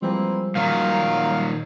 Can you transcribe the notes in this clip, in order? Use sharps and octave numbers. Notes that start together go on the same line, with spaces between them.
E3 F3 G3 G#3 A#3 C4
A#2 D#3 F#3 F5